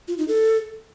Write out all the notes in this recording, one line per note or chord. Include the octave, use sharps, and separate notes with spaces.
F4
D#4
A4